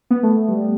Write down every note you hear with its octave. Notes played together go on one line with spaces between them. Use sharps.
B3
A3
A3
G3